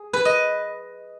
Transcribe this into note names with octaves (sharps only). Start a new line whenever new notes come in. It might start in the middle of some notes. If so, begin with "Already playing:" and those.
Already playing: G#4
B4
D#5